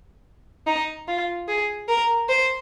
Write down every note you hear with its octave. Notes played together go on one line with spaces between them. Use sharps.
D#4
F4
G#4
A#4
C5